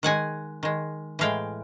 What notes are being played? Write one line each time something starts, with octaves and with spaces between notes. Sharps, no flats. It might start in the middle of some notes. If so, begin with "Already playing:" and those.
D#3 G#3 F#5 G#5
D#3 G#3
A2 E3 G#3 F5 G5